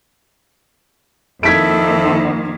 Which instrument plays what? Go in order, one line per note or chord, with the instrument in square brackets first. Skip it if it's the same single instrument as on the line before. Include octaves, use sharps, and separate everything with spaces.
[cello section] F2 D#3 A#3 [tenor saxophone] E4 [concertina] A4 [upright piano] G#6 B6 D7